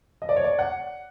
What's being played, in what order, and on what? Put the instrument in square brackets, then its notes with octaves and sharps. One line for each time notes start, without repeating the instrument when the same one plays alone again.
[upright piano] D#5
D5
C#5
D5
F#5